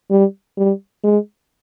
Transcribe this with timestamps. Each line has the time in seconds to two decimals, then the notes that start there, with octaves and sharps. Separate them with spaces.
0.11 G3
0.57 G3
1.04 G#3